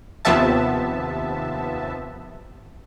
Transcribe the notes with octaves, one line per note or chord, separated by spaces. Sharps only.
D#2 C3 F3 B3 E5 A5